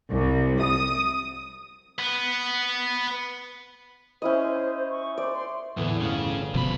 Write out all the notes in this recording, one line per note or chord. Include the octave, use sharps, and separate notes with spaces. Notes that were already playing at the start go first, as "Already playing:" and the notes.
C2
D#6
B3
C#4 E4 C5 D#5
C#6
C5 D5
C6
E2 A2 D3 E3 B3
G1 A3 C#4 G#4 F5
F#1 D2 B2 F3 B5